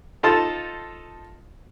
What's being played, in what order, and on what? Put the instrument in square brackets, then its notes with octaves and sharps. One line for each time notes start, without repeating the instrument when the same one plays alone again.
[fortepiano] D#4 F4 A4 C5 A5